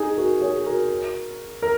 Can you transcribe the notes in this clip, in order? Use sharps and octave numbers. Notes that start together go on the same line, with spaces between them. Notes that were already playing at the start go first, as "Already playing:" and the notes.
Already playing: D#4 G#4
F#4 A#4
G#4 C#5
F#4 A#4
A#4